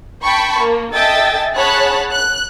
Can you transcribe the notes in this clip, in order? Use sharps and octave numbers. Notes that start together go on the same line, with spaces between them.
G5 A5 B5 C#6
A#3
A4 D#5 E5 G5 G#5 A6
G#4 C#5 F#5 A5 B5 F#6
F#6